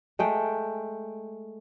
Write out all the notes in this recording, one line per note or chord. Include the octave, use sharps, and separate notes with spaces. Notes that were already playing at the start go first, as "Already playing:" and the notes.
G#3 A3 G5